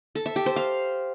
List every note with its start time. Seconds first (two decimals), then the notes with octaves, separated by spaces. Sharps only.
0.15 A4
0.26 E5
0.36 G4
0.46 C5
0.56 F5